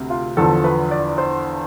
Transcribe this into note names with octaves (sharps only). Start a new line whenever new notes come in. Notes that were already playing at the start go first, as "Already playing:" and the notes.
Already playing: D2 C3
F4
E2 D3 F3 A4
B4
D5
C5